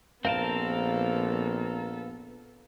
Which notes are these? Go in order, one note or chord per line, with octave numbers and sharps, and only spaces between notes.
A#1 B3 C4 A4 A#4 F5 A5